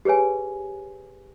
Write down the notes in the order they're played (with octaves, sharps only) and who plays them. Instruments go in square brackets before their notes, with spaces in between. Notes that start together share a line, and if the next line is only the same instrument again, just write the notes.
[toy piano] G4 G#4 B4 C#5 G#5